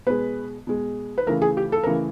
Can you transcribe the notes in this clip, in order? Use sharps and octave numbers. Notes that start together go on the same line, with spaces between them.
B2 G#3 B4
B2 G#3
B4
C#3 E3 A3 A#4
G#4
G4
A4
C#3 E3 A3 A#4